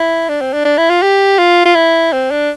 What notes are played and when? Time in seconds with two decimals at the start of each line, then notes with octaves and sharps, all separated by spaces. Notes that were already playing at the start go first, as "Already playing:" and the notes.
Already playing: E4
0.29 D4
0.41 C4
0.53 D4
0.65 D4
0.78 E4
0.90 F4
1.02 G4
1.39 F4
1.65 F4
1.75 E4
2.12 C4
2.31 D4